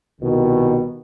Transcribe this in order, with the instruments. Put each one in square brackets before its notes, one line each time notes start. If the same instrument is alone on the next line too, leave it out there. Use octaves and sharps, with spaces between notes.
[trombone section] C2 B2 D#3